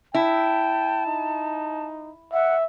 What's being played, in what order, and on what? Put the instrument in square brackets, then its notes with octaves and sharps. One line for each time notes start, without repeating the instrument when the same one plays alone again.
[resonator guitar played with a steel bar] E4 [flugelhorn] G5 [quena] A5
[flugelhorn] D#4
[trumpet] E5 [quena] F#5